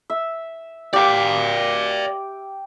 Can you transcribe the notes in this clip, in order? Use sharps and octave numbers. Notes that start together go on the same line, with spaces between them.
E5
G4 D5 F5 D6